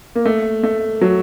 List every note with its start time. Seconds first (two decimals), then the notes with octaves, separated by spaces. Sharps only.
0.15 A#3
0.25 A3
0.63 A3
1.01 F#3